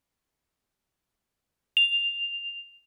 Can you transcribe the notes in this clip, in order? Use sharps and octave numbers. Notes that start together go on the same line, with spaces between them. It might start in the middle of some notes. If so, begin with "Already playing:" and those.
F7